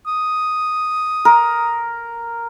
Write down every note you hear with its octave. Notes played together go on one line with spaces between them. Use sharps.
D#6
A#4